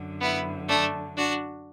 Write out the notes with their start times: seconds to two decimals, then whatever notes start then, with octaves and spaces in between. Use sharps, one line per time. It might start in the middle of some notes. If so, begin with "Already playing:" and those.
Already playing: F#2 D3
0.20 B3 E4
0.68 A3 D4
1.17 D4 F#4